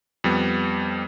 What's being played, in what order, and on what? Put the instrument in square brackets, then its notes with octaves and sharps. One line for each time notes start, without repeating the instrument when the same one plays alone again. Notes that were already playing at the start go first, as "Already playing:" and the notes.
[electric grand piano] F2 G3 B3